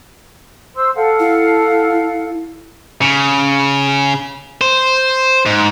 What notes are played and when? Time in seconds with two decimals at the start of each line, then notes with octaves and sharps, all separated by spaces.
0.75 C5 C6 E6
0.96 A4 F5 F#5
1.20 E4
3.02 C#3
4.61 C5
5.46 G#2